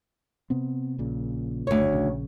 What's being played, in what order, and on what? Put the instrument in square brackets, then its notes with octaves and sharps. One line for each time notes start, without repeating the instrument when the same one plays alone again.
[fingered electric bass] C3 B3 C4
A#1 A#2 C#3
[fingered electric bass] F#1 [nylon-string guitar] D2 C#5
[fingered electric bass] A#1 C#3